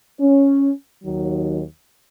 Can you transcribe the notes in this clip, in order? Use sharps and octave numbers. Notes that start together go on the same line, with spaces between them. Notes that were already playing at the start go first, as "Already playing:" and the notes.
C#4
D#2 D#3 F#3